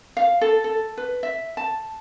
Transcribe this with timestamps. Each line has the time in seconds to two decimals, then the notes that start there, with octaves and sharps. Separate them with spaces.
0.17 F5
0.41 A4
0.64 A4
0.97 B4
1.23 E5
1.57 A5